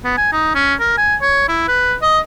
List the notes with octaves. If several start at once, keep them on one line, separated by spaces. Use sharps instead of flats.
B3
G#5
D#4
C#4
A#4
G#5
C#5
E4
B4
D#5